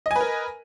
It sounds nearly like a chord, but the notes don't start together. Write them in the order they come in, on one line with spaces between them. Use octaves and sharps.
D#5 G#5 B4 A#4